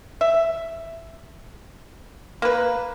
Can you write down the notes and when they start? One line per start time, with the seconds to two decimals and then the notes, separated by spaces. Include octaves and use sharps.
0.21 E5
2.42 A#3 B4